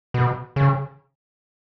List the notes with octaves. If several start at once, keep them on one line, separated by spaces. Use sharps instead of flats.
B2
C#3